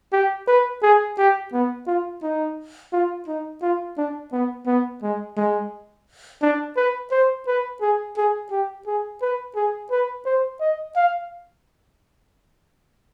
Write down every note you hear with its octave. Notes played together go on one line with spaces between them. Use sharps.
G4
B4
G#4
G4
B3
F4
D#4
F4
D#4
F4
D4
B3
B3
G#3
G#3
D4
B4
C5
B4
G#4
G#4
G4
G#4
B4
G#4
B4
C5
D#5
F5